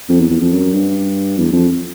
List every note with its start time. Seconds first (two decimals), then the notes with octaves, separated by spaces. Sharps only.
0.09 F2
0.20 E2
0.30 E2
0.41 F2
0.52 F#2
0.73 G2
1.38 E2
1.52 F2